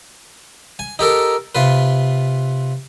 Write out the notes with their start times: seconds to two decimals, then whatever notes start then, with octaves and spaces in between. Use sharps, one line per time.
0.79 G#5
0.99 D#4 G4 A4 A#4
1.55 C3 F4 B4